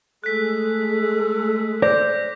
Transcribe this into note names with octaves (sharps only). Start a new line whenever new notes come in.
G#3 A3 G#4 A4 F#6 B6
C5 D5 D6 G6 A#6